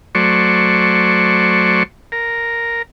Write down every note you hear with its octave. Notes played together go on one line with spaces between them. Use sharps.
F#3 A3 C5 D5 C#6
A#4